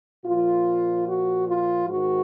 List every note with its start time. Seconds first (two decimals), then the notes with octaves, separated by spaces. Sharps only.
0.25 A#2 F3 F4
1.06 F#4
1.46 F4
1.86 G#2 D#3 F#4